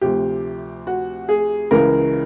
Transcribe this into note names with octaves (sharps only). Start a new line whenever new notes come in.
D2 C3 F3 G4
F#4
G#4
C#2 C#3 E3 A#4